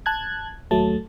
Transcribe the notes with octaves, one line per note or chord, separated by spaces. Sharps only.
A5 F#6 G#6
D#2 F#3 A3 A5